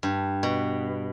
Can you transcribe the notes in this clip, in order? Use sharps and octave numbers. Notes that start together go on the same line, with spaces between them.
G2
B2